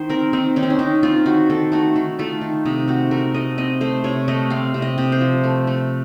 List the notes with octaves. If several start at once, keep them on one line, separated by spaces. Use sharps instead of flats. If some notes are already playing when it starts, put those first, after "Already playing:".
Already playing: D#3 C5
C4 A#4
D#3 C4
D#3 C#4
C4
C#4
D#3 D#4
C4 F4
D#3 F#4
D#3 A4
A3 F#4
D#3
A3 F4
D#3
C3 D#4
C4 F#4
A3 A#4
A3 D#5
C4 D#5
A3 C5
C3 C#5
A3 D#5
C4 F5
C3
D#5
C3
C5
F3
A3
A3